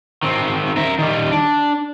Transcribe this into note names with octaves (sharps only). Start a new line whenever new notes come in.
D#3 C4
A#4 E5
D#3 G3
D4